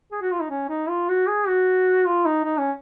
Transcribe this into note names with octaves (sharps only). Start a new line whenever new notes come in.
G#4
F#4
F4
D#4
C#4
D#4
F4
F#4
G#4
F#4
F4
D#4
D#4
C#4